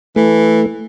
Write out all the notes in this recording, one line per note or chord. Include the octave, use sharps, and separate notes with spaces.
E3 A3